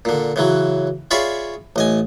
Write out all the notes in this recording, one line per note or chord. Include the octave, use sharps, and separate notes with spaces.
A#2 D3
C#3 E3 F#3
F4 G#4 C#5 D5 E5 B5
A1 D#5 G#5